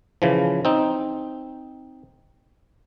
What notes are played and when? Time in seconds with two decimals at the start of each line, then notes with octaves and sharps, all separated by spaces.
0.22 C#3 E3 F3
0.65 C4 D#4